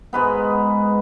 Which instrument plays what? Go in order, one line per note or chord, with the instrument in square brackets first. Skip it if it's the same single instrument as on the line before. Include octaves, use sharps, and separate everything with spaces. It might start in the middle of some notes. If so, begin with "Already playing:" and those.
[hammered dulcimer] G#2 G#3 B3 B4